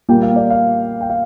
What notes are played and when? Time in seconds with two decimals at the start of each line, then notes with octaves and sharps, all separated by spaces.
0.09 A#2 G3 A#3 G5
0.22 F5
0.36 D5
0.50 F5
1.01 G5
1.10 F5